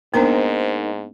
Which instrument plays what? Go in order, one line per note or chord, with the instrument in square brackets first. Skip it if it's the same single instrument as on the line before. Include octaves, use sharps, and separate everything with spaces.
[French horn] G#2 [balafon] A#3 B3 D4 [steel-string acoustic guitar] D#4 A#4 C5